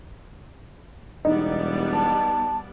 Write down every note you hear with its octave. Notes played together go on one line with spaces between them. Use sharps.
E1 G3 B3 D#4 D5
A5